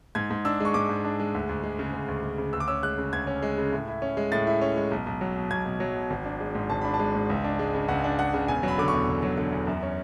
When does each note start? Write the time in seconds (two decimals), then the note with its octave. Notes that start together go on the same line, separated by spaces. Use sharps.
0.15 G#2 G#6
0.30 G#2
0.45 D4 E6
0.60 G#3 C#6
0.74 G#2 D6
0.89 G#2
1.05 D4
1.20 G#3
1.34 D2
1.49 D2
1.64 G#3
1.79 C#3
1.93 D2
2.08 D2
2.23 G#3
2.38 C#3
2.53 D2 E6
2.60 D6
2.68 C#4 E6
2.83 G#3 F#6
2.98 C#3
3.13 D2 G#6
3.27 C#4
3.42 G#3
3.58 C#3
3.72 A2
3.87 E4
4.02 C#4
4.17 G#3
4.32 A2 A6
4.47 E4
4.61 C#4
4.76 G#3
4.91 B1
5.06 B1
5.21 F#3
5.36 B2
5.51 B1 G#6
5.66 B1
5.80 F#3
5.96 B2
6.10 G#1
6.25 D4
6.40 G#3
6.55 G#2
6.70 G#1 A5
6.81 D4 B5
6.94 A5
6.99 G#3
7.15 G#2
7.30 C#2
7.44 D4
7.59 G#3
7.74 C#3
7.88 C#2 F#5
8.04 D4
8.19 G#3 F#5
8.34 C#3
8.48 E1 G#5
8.63 F#3 B5
8.78 D3 D6
8.88 E2 C#6
9.08 E1
9.23 F#3
9.38 D3
9.53 E2
9.67 F#2
9.83 C#4